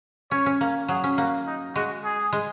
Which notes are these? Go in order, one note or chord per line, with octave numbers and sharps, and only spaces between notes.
C#4 C#5
C#4
A#3
F#3 G#4
C#4
A#3 F#4
D#4
G#3 F#4
G#4
G#3